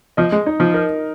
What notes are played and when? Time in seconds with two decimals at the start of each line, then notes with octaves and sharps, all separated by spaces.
0.17 F3 D#5
0.32 G#3
0.46 D#4
0.60 F3
0.74 A#4